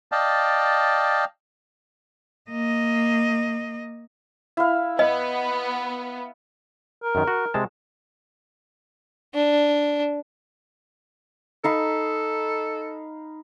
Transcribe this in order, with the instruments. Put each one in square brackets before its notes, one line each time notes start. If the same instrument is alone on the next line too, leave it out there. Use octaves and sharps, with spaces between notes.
[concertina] D5 D#5 F5 G5 A5
[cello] A#3 D#5
[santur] E4 F5
[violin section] B3 [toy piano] D#5
[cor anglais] A#4
[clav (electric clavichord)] F#2 D#3
F#4
C3 G#3 A5
[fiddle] D4
[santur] D#4 F5 B5 [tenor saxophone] A4